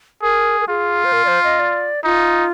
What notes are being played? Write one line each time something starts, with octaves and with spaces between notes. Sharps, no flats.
G#4 A#4
A#4
F4 G#4
C5
A#4
D5
C5
D#5
D5
D#4 F4